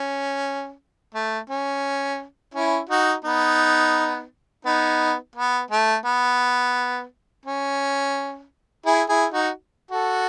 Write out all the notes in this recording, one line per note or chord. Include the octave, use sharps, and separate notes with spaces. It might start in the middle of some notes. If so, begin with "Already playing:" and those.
Already playing: C#4
A3
C#4
C#4 E4
D#4 F#4
B3 D#4
B3 D#4
B3
A3
B3
C#4
E4 G#4
E4 G#4
D#4 F#4
F#4 A4